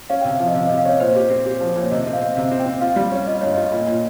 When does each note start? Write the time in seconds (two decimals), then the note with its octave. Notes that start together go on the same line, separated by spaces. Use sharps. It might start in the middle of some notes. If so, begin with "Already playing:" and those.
0.10 C#4 F5
0.21 G5
0.25 C3
0.32 F5
0.40 F3
0.47 D#5
0.55 C3 F5
0.66 D#5
0.69 C3
0.78 F5
0.85 C#4 C#5
1.00 A#2 C5
1.15 G4
1.30 C4
1.46 G4
1.61 F3
1.76 A#2 C#5
1.91 C3 D#5
2.07 C4
2.13 F5
2.21 C4
2.36 C3 F5
2.51 C4
2.59 G5
2.66 C4
2.81 F4 F5
2.96 G3
3.12 C#4
3.27 F4 D#5
3.41 G2 C#5
3.54 F4 D#5
3.72 A#2
3.87 A#2